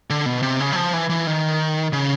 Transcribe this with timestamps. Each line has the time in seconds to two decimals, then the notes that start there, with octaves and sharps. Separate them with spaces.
0.10 D3
0.26 B2
0.42 C3
0.60 C#3
0.73 F#3
0.76 F3
0.93 E3
1.10 E3
1.27 D#3
1.93 C#3